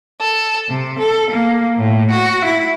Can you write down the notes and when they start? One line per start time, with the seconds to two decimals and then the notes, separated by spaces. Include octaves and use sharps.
0.22 A4
0.68 C3
0.98 A4
1.30 A#3
1.76 A2
2.10 F#4
2.45 E4